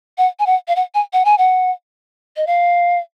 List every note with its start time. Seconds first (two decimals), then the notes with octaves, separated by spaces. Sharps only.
0.18 F#5
0.39 G#5
0.46 F#5
0.68 F5
0.76 F#5
0.94 G#5
1.13 F#5
1.25 G#5
1.38 F#5
2.37 D#5
2.47 F5